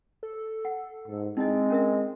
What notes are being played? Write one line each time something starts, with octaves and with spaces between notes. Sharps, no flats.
A4
F#5
G#2
G#3 C4 D#4 E4 D#5
C#4 A#4 E5